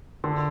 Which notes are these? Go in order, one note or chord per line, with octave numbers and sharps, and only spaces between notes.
D3